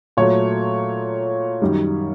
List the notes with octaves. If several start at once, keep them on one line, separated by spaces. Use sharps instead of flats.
A#2 F#3 A3 C#5
F#2 D#3 G3